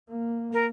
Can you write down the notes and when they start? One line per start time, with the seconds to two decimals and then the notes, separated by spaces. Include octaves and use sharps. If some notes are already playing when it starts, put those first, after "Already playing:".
0.10 A#3
0.53 A#4